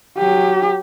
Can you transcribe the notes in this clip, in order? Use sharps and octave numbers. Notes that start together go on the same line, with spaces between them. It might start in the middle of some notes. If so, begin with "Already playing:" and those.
F#3 G4